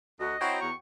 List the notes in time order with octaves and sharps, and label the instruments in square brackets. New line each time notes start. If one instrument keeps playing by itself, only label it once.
[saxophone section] D2 [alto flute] F#4 [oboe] D#5
[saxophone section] C4 E4 C5 [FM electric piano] F#4 C#5 G5 [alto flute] A#5
[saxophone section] E2 [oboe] C#6